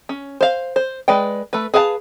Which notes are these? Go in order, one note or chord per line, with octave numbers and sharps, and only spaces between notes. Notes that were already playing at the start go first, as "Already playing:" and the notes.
C#4
C5 F5
C5
G#3 B4 D5 G5
A3 B4
G#4 B4 F5 G#5 A5